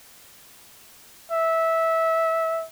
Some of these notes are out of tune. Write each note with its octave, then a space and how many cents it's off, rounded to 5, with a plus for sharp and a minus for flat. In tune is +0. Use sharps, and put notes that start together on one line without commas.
E5 -15